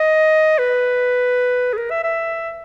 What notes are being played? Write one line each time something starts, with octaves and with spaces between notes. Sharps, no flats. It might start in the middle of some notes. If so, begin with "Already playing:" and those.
Already playing: D#5
B4
G#4
A#4
E5
E5